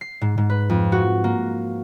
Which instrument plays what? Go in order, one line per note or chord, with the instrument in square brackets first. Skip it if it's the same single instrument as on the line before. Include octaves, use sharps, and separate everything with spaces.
[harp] C7
G#2
G#2
B4
F2
F#4
A#3